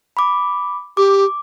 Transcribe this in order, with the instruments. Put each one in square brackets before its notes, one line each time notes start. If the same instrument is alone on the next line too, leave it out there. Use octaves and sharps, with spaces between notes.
[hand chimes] B5 D6
[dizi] G4 [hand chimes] D6